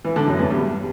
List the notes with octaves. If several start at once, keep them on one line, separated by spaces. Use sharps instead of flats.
E3
D3
F#2
E2
G2